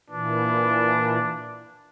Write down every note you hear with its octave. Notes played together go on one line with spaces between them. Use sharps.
A#2 E3 D4